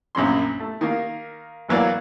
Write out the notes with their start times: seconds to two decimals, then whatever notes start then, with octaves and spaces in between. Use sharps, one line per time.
0.15 A#1 F#2 C#4 C6
0.60 A3
0.81 D#3 A#3
1.68 G#1 E3 F#3 A#3 B4 D5